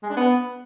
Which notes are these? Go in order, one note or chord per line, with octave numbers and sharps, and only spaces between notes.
G#3
D4
B3